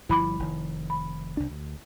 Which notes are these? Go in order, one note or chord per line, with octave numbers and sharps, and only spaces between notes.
G1 F3 G3 E4 B5 D6
F1 D#3
B5
C2 D4
D2